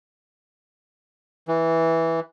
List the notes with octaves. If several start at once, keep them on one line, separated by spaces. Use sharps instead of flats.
E3